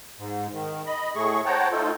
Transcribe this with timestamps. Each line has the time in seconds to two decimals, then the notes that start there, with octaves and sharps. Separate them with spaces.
0.19 G#2
0.53 D#3
0.86 D#5 B5
1.16 A2 A3 G#4 C#6
1.46 C5 C#5 F#5 G5 A5 A#5
1.71 A3 D#4 F4 A4